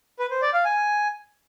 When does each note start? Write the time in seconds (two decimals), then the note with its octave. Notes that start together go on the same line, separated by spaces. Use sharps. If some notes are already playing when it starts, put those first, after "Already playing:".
0.19 B4
0.31 C5
0.42 D5
0.53 F5
0.65 G#5